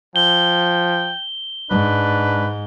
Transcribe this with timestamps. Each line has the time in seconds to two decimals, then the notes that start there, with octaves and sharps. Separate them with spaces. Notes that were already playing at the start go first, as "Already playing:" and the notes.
0.16 F3 G5 G7
1.70 G#2 D4 B4